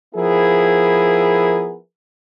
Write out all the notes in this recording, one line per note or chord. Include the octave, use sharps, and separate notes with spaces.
F3 B3 E4 G#4 A#4